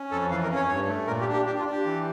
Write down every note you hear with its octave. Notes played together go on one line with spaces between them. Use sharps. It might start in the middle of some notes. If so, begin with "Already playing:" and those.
Already playing: C#4
F2 A4
E3 F5
A#4
C#4
C#5
G2 C#5
A3
A#2 A#4
G4
D4
G4
D4 G4
F4
D4
G4
E3